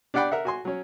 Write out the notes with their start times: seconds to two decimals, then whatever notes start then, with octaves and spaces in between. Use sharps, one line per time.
0.14 D4 G4 D5 F#5 G5 B5
0.31 A#4 E5 F#5
0.45 F#4 G#5 C6
0.65 F#3 C#4